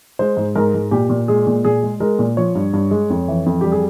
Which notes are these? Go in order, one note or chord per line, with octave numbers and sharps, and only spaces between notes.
G#3 C5
G#2
G#2 A#4
G#2
A#2 G4
A#2
G#3 G#4
A#2
A#2 G#4
G#3
G#3 A#4
A#2
F3 C#5
G2
G2
G#3
F2
E3
F2
G3 G4
G#4